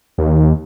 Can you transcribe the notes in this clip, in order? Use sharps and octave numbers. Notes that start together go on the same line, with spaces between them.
D#2